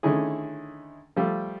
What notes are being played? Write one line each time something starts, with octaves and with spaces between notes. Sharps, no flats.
D3 D#3 A3 C#4 E4 G#4
F3 G3 A3